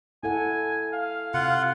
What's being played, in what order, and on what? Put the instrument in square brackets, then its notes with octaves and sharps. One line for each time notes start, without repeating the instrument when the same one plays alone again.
[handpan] E4 A4 F#5 [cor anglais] G#5
[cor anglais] F5
[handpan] C3 [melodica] F4 F#5